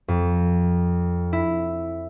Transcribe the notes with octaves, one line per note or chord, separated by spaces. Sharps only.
F2
E4